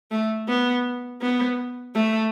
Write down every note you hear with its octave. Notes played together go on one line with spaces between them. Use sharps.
A3
B3
B3
A3